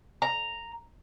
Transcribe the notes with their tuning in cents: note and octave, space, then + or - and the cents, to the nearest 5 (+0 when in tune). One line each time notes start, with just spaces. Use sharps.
A#5 -5